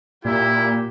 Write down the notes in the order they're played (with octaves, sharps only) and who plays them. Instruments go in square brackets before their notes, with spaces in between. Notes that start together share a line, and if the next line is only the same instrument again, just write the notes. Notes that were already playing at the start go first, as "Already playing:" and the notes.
[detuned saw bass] A#2 [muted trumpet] E4 [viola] G4